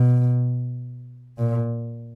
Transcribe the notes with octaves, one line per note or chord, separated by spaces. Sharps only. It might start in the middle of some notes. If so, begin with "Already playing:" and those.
Already playing: B2
A#2